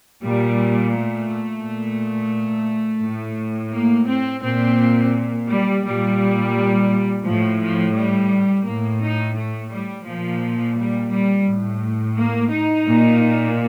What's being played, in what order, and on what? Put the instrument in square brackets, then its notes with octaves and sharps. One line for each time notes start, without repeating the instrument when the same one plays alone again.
[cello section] A#2 G3
A3
A#2
A2
A#3
C4
A#2 C4
G3
A#2 G3
A2 F3
F3
G3
A2 A#3
D#4
A3
G3
A#2 F3
G3
G3
A2
A#3
D#4
A#2